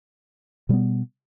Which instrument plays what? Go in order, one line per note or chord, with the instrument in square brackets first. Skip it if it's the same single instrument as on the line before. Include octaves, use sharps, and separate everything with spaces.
[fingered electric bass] B2 G3 B3